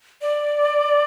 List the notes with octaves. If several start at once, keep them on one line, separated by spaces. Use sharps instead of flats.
D5